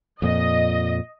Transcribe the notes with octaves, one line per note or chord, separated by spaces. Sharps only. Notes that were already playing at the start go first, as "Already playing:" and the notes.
F2 A#2 D#5